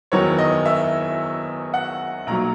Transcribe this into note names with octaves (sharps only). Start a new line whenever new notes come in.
F#1 E2 D#3 F#3 B3 C#5
D#5
E5
F#5
B1 A#2 F#3 A#5